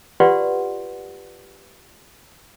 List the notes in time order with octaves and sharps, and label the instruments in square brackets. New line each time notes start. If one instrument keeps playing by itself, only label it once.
[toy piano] F4 G4 B4 D5 F#5 C6